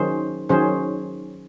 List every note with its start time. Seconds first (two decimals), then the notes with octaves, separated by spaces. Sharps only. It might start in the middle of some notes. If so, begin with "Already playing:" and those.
Already playing: D#3 F#3 C#4 G#4 C5
0.49 D#3 F#3 C#4 G#4 C5